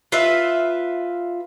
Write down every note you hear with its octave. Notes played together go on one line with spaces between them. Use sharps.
F4 B4 E5